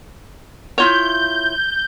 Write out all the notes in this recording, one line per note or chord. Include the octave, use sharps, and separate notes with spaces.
E4 F4 C#5 G6